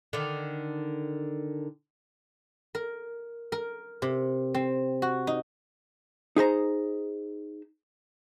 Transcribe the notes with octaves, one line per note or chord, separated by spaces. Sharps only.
D3 D#3
A#4
A#4
C3
C4
F#4
D#4
D#4 G#4 C5 A#5